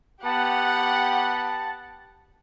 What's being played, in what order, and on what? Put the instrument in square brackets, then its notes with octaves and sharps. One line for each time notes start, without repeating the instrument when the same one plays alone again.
[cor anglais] B3 [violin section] G4 F#5 [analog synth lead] A5